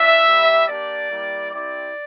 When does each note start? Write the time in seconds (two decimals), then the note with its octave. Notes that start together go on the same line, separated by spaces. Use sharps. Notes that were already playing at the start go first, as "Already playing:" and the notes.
Already playing: D4 F4 E5
0.26 G3 A#3 E4 G4
0.68 A#3 D4 G4 D5
1.10 G3 A#3 E4 G4
1.51 C4 E4 G4 D5